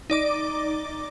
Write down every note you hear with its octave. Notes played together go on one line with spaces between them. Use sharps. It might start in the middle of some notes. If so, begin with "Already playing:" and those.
D#4 D5 D6